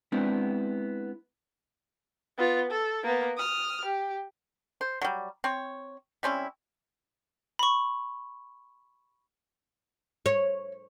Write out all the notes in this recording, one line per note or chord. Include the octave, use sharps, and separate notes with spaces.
G#3 B3 C4 D4 E4
B3 F4
A4
A#3 B3
D#6 F6
G4
C5
F#3 G3
C4 C#5
G3 C4 C#4 E4
B5 C#6
C#5